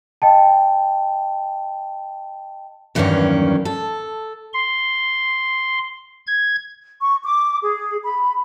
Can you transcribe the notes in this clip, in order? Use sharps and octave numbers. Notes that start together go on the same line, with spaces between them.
D#5 G5 A5
E2 G2 D#3 F#3 A#3 C#4
A4
C6
G#6
C#6
D6
G#4
B5